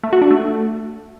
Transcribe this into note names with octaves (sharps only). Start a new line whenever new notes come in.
A3
F#4
D4
A3